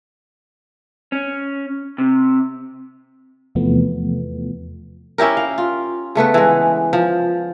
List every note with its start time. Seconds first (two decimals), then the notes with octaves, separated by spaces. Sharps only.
1.12 C#4
1.98 C3
3.55 E2 C3 E3 F3 A3 B3
5.18 C#4 E4 G4 A#4
5.37 F5
5.58 F4
6.15 C#3 A3 B3 B4
6.34 E3 G#3
6.93 F3